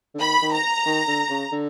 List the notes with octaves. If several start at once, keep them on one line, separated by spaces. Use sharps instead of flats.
D3
D#3 B5
D#3
A#5
D#3
D3
C#3
D3